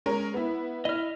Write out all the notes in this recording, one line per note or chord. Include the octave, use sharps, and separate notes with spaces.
G#3 C#4 A#4
B3 E4
E4 D#5 F6